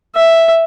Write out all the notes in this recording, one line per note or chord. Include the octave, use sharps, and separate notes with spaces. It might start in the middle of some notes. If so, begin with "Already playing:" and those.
E5